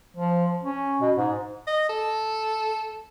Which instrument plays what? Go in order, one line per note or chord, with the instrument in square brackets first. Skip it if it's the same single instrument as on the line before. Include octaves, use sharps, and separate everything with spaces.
[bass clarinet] F3
C#4
B2
G#2
[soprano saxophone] D#5
A4